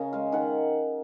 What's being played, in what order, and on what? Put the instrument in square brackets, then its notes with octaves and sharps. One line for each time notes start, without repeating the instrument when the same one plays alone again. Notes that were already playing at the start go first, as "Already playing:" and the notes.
Already playing: [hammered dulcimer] C#3 A#4 D#5 G#5
G#3 F5
D#3 F#5